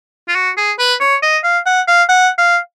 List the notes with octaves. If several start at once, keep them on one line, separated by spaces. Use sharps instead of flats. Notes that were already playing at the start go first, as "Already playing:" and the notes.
F4
F#4
G#4
B4
C#5
D#5
F5
F#5
F5
F#5
F5